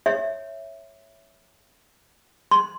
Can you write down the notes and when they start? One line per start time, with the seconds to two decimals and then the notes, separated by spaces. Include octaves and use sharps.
0.06 C#5 E5
2.51 C6